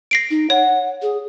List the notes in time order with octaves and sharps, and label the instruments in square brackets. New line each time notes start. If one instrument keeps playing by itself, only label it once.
[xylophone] A#6 C7 D7
[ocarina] D#4
[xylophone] C#5 [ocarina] F#5
[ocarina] G#4